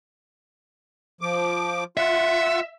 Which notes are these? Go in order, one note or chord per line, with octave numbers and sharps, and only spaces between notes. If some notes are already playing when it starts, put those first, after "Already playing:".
F3 D6
F4 E5 F#5